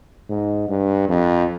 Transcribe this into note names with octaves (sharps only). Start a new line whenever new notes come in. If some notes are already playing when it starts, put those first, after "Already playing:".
G#2
G2
F2